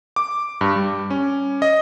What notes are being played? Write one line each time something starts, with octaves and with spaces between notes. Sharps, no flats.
D6
G2
G3
C#4
D#5